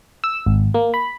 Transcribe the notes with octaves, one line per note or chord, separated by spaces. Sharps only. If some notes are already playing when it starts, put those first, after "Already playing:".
E6
G#1
A#3
B5